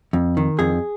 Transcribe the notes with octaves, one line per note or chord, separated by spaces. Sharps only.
F2
D#3
F2 G#4